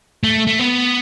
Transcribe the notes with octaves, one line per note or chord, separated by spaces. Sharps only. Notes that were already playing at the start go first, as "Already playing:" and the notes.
A3
A3
B3